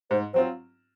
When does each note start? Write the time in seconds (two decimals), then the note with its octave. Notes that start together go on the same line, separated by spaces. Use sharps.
0.10 G#2 C5
0.34 F#3 C4 F4 C5